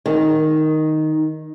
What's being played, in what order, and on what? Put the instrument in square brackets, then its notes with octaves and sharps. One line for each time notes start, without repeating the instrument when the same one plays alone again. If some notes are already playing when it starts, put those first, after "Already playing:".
[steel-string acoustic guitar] D#3